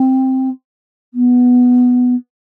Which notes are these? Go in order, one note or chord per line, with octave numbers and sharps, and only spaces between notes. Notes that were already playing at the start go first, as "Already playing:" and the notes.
Already playing: C4
B3